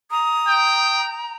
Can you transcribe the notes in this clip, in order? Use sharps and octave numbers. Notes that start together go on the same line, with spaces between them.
A#5 D#6
G5